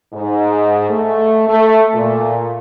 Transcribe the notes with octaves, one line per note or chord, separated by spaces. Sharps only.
G#2
A3
A3
A#2